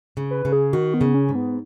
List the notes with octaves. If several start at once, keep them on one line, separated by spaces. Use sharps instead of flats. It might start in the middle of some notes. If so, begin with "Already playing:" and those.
C#3
B4
C#3
G#4
D#3 F#4
B3
C#3
C#4
G#2
B3